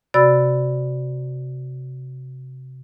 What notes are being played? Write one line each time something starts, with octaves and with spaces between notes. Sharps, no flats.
C3 F#4 D5 B5 E6 A6